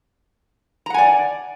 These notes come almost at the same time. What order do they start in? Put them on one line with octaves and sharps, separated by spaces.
A#5 F#5 G#5 D5